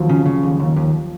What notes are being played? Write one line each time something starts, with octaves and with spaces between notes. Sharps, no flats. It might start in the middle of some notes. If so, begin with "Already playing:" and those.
Already playing: D#2 F3 F#3
C#3
C#3
D#2
D#2
D#2